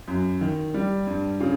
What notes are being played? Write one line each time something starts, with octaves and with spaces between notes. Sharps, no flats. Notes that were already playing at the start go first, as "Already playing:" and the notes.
F#2
D#3
G3
G2
C#3